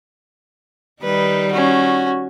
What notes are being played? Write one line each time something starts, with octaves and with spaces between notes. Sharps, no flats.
D#3 G3 D#4 B4
C#4 F#4